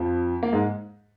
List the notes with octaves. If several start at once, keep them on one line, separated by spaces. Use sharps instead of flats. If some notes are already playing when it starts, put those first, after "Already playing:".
Already playing: F2 F3
A#3
G#2 G#3